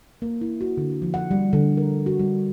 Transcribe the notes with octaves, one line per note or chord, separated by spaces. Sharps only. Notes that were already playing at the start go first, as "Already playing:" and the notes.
A#3
E4
F#4
D3
F3
F#5
G3
D3
A#4
F#4
G3